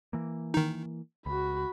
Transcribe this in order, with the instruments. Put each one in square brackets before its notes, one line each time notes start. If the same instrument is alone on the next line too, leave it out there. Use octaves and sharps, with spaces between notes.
[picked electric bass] E3 A#3
[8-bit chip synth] D#3 D#4
[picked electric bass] C#2 [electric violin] F#4 B5